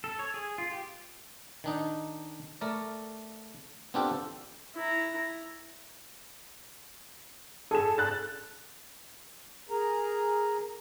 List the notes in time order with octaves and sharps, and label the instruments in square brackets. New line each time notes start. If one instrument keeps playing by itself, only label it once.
[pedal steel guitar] A4
C#5
G#4
F4
G4
[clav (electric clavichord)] D#3 D4 D#4
A3 A#4 D5
B3 C4 D4 F4 G4 A4
[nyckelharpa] E4 A#5
[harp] G#4 [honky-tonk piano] A4 E7
[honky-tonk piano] F#6 A6
[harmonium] G#4 A#4 A#5